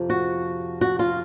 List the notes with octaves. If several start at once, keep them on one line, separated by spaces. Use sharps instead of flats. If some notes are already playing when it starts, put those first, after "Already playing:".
Already playing: F2 C3 F3
F#4
F#4
F4